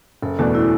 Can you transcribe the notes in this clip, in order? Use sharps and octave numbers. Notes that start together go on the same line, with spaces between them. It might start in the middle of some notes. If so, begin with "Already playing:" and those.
F#1 A4
E2 B2 A3 D4 F#4
E4